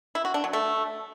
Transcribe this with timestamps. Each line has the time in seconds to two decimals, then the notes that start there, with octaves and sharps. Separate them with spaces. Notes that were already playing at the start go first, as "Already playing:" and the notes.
0.15 E4
0.25 F#4
0.34 D4
0.44 F#3
0.53 A3